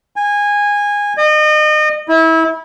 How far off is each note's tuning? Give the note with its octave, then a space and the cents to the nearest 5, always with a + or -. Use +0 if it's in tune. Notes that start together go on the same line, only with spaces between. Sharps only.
G#5 -20
D#5 -35
E4 -25